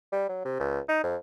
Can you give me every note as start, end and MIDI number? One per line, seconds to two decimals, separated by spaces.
0.13 0.27 55
0.29 0.43 54
0.45 0.60 48
0.60 0.80 37
0.88 0.99 63
1.04 1.16 41